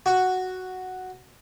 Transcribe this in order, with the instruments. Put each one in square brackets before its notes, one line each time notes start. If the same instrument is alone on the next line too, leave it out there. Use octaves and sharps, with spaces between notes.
[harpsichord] F#4